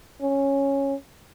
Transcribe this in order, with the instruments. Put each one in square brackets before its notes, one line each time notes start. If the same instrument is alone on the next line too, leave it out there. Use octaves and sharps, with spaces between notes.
[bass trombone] C#4